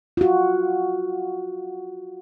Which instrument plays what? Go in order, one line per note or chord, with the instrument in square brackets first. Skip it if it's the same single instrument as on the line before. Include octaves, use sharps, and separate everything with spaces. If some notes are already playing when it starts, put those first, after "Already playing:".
[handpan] F4 F#4